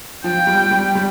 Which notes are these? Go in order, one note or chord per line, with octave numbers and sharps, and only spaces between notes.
F3 G5
G3
G3
G3